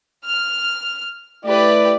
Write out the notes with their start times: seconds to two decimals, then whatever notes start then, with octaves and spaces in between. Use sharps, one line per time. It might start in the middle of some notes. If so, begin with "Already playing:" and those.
0.24 F6
1.45 A3 E4 G4 B4 D5